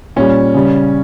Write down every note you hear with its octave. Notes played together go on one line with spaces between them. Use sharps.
A#2 G3 C#4
C#3 G3